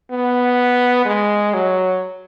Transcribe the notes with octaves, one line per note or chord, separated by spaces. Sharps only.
B3
G#3
F#3